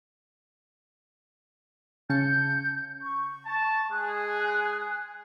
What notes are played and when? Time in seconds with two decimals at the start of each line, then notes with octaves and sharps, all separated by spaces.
2.10 C#3 A5 G6 C#7
3.02 C#6
3.46 A5
3.91 G#3 G#4 G#5 F#6